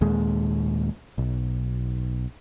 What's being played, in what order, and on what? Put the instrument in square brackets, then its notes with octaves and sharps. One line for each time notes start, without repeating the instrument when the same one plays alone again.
[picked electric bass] D#2 A#2 G#3
B1